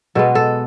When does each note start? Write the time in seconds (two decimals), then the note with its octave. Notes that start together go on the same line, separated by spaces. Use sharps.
0.15 B2 G#3 B3 A4
0.35 A4